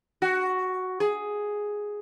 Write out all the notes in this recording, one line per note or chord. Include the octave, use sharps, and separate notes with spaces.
F#4
G#4